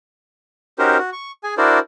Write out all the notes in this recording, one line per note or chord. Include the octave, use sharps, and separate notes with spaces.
C#4 D#4 F#4 G4 A#4 C5
F#4
C#6
G#4 G#5
D4 E4 F#4 A#4 C5 D5